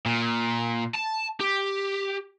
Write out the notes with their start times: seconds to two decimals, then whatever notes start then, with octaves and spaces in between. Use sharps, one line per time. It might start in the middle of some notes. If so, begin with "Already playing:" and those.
0.06 A#2
0.94 A5
1.41 G4